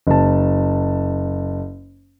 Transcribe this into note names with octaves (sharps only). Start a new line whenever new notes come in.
F#1 A5